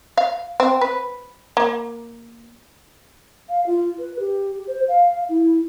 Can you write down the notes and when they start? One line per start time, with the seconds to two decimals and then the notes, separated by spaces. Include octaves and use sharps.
0.17 F5
0.60 C4
0.81 B4
1.57 A#3
3.49 F5
3.66 F4
3.99 B4
4.19 G4
4.67 C5
4.88 F5
5.29 E4